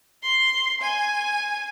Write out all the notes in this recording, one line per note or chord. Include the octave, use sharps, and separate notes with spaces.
C6
G#5